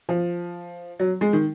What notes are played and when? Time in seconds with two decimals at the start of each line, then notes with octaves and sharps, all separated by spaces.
0.09 F3
1.00 F#3
1.21 G#3
1.33 D#3